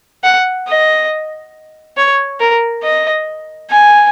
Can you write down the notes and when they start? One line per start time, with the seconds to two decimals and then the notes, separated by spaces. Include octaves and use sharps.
0.24 F#5
0.67 D#5
1.97 C#5
2.40 A#4
2.83 D#5
3.70 G#5